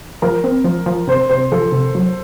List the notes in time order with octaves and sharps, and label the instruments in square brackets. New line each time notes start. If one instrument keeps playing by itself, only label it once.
[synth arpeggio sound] F3 [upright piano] A#4
[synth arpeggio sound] C4
F3
F3
[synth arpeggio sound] C3 [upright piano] C5
[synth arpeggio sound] C3 [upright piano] C5
[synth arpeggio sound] F3 [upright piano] A4
[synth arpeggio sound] C3
F#3